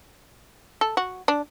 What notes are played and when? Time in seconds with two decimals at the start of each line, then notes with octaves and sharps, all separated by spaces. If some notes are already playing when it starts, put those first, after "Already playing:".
0.81 A4
0.97 F#4
1.28 D4